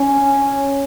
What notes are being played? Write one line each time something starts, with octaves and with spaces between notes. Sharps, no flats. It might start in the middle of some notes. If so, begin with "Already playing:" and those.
Already playing: C#4